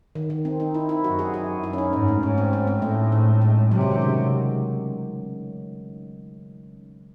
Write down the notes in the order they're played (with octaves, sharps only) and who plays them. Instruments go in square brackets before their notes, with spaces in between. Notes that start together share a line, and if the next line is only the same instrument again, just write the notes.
[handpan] D#3
D#3
C4
D#4
E4
E4
[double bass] F#2 [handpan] F#4
[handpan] G#4
G#4
E4
C#4
D#4
[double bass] G#2 [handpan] C#4
[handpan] A3
[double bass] G#2 [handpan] C#4
[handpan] C4
C4
C4
[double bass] A2 [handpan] A3
[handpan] G#3
G#3
[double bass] C3 [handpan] F#3
[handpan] C#3
D#3
G#3